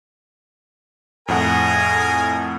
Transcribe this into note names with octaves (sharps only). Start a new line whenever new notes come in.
F2 A2 G#4 A#4 F#5 G#5